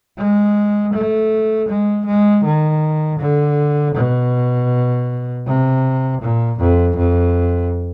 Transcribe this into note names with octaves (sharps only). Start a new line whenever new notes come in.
G#3
A3
G#3
G#3
D#3
D3
B2
C3
A#2
F2
F2